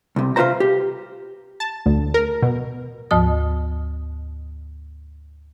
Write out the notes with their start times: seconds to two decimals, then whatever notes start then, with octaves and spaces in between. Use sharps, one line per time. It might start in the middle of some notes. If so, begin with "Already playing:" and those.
0.16 C2 C3
0.36 C3 F4 F#4 B4 C5 A#5
0.60 G4
1.60 A5
1.86 D2
2.14 A#4
2.42 B2
3.11 D2 G#2 F3 D#6